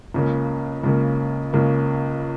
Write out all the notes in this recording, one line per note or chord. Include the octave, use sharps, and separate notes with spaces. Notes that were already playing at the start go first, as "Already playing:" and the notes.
C#2 C#3 A#3
C#2 C#3 A#3
C#2 C#3 A#3